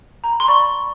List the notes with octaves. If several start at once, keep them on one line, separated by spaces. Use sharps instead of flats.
A#5
B5
C6
D5 B5 C#6